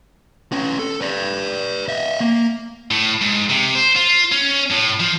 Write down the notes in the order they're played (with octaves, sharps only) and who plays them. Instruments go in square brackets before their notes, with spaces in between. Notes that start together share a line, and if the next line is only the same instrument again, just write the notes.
[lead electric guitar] C#4 B4
A4
B4 D5
D#5 E5
A#3
[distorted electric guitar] A2
G#2
C3
C5
F4
C#4
A2
F3